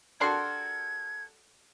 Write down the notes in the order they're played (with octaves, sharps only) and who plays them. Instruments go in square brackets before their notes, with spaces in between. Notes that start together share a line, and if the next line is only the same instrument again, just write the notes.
[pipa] G3 D4 C6 [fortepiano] F#4 A4 A#4 [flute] G#6